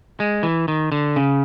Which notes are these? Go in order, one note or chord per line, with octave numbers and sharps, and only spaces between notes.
G#3
E3
D#3
D3
C#3